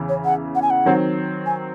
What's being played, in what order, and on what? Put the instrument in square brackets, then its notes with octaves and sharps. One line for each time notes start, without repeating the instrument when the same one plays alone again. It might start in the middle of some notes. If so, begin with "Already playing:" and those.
Already playing: [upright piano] E2 C#3 E3
[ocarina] C#5
F#5
F#5
G#5
F#5
[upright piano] D#3 F#3 C4
[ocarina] G#5